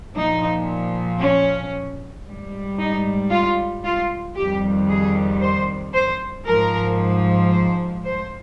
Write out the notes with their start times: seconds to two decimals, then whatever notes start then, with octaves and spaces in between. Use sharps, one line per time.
0.14 A#2 F3 D#4
1.20 C#4
2.26 G#2 G3
2.78 D#4
3.31 F4
3.83 F4
4.36 F2 D#3 G3 G4
4.89 G#4
5.41 C5
5.94 C5
6.47 G#2 F3 A#4
7.52 C5
8.05 C5